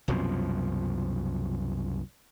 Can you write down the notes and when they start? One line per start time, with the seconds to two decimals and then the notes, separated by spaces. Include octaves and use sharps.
0.08 C2 F#2 B2 F3